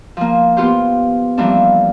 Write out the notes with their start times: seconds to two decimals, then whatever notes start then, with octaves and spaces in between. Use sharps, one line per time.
0.17 F3 A#3
0.57 B3 F4 G4 C5
1.38 E3 F3 G3 A#3 C4 D4